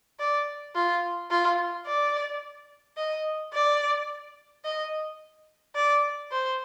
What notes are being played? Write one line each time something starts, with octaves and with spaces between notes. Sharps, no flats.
D5
F4
F4
D5
D#5
D5
D#5
D5
C5